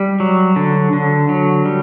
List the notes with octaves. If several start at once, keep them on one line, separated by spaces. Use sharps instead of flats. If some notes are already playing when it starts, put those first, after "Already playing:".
Already playing: G3
F#3
D3
D3
F#3
G3